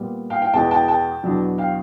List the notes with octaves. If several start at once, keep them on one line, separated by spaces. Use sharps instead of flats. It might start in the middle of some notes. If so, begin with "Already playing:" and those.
Already playing: A#2 G3 B3
F5 G5
F5 G5
E2 B2 G#3 B3 G5 A5
G5 A5
G5 A5
E2 B2 F#3 B3 D4
F5 G5